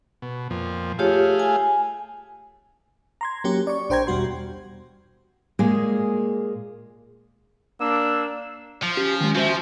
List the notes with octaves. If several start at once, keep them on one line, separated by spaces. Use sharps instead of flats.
B2
F2 A#2 F3
A3 F4 G4 G#4 C#5 F5
G#5
A#5 C6 G#6
F#3 A#3 C#4 G4
D5 C#6
A#1 D4 C5 G5 A#5 G#6
E2 B2 G3 F#4 C6
A#2 G#3 A#3 G#4
A#3 D4 E6
F3
C#4 G4
D#3 G#3
F3 F#4 C5 E5